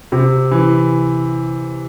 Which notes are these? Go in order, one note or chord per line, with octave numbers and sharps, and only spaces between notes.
C3
E3